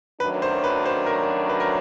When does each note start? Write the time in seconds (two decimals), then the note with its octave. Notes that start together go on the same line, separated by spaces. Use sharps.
0.20 F#2 D#3 F#3 A3 D4 B4
0.42 C5
0.64 B4
0.86 C5
1.06 A#4
1.49 B4
1.60 A#4